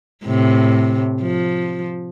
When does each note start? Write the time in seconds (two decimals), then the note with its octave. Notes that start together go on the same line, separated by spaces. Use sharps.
0.25 A2 C3
1.21 F3